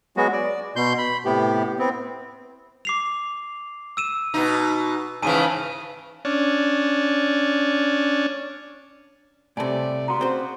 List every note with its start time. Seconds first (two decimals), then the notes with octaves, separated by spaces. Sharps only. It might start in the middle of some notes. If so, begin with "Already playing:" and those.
0.17 F#3 G#3 B3 F#4
0.33 D5
0.76 B2 C6 G6
0.98 B5
1.25 A2 C3 B3 G4
1.79 B3 C4
2.85 D6 C7 F7
3.97 E6 D#7 E7
4.34 B2 D#4
5.22 G#2 C#3 E3 G#5 A5 D#7
6.25 C#4 D4
9.57 A2 C3 G3 A3 D5 G#5 A5
10.08 C#3 B3 F#4 A#5 C6
10.21 C4 G#4 C5